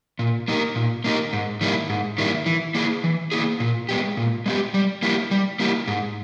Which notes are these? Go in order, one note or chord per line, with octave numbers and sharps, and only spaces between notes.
A#2
A#3 D#4 G4 A#4
A#2
A#3 D#4 G4 A#4
G#2
D#3 G3 A#3 E4
G#2
D#3 G3 A#3 E4
E3
A#3 E4 G#4
E3
A#3 E4 G#4
A#2
G#3 B3 G4
A#2
G#3 B3 G4
G3
A#3 E4 G4
G3
A#3 E4 G4
G#2